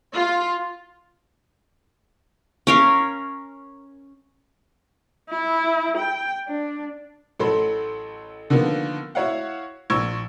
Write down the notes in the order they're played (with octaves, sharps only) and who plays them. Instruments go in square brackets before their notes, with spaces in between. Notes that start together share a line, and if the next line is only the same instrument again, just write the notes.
[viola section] F4
[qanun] C#4 A#4 F5
[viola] E4
G5
D4
[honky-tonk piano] A1 F#3 A4 B5 C6
D3 D#3 F3 A#3 B3
E4 F#4 C#5 F5 F#5
A#1 C#6 E6 G#6